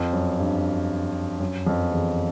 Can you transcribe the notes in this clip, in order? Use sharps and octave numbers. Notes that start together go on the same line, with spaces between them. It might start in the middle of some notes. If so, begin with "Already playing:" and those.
Already playing: F2
F#2
G2
F#2
F2
E2